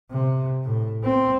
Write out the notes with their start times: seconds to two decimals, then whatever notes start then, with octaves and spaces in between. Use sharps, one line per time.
0.11 C3
0.63 A2
1.04 C4